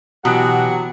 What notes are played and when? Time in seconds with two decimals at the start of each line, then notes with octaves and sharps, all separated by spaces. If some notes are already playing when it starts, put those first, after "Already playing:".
0.25 B2 E3 F#3 G4 F#5